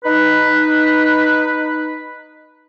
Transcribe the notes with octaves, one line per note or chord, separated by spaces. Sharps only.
D#4 B4